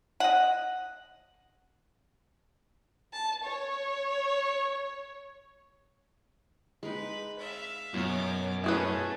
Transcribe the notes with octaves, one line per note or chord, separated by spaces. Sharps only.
D#5 F#5
A5
C#5
G#3 D#4 B4
E5 F5
F#2 B2 C#5 D6
A3 C#4 E4 G#4 B4